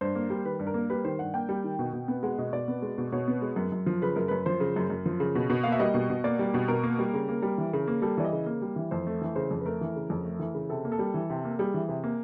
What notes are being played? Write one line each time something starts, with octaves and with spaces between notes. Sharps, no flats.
G2 C5
A#3
G3
D#3 B4
G2
A#4
A#3
G3 B4
D#3 C5
G2 F#5
A#3 G5
G3
D#3
B2
B2
B3
G#3 F#5
B2 D#5
B2 D5
B3
G#3
B2
B2 C#5
B3
G#3
F#2
F#2
F3
C#3 B4
F#2 A#4
F#2 B4
F3 C5
C#3
F#2
F#2
F3
C#3
B2
B2
A#3 F5
E5
G3 D#5
B2
B2
A#3 D5
G3
B2
B2 A#4
A#3
G3
C#3
A#3
G3
E3
C#3
A#3
G3 A4
E3 D5
D#5
C#3
A#3
G3
E3
F2 C5
A3
E3
C#3 C5
F2
B4
A3 A#4
E3
C#3
F2
A3
E3
C#3
C3 A4
A#3
A4
G3
E3
C3
A#3
G3 G#4
E3
C3
A#3